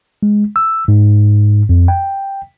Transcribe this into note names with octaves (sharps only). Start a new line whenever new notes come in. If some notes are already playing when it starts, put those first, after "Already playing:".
G#3
E6
G#2
F2
G5